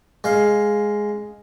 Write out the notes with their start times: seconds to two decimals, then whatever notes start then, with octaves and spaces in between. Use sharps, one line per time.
0.24 G#3 F5